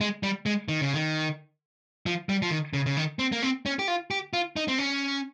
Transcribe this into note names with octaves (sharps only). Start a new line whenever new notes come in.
G#3
G3
G#3
D#3
C#3
D#3
F3
G3
F3
D#3
C#3
C#3
D#3
C4
A#3
C4
C#4
G4
F4
G4
F4
D#4
C4
C#4